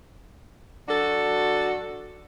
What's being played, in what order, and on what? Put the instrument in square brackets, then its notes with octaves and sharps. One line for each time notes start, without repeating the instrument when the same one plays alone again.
[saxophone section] F#3 D4 F#4 A4